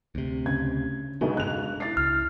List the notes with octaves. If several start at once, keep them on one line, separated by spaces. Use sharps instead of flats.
D2 C3
C#3 G#6
B1 B2 D3 G#3
F#6 F7
E4 A6 C7
C#2 F6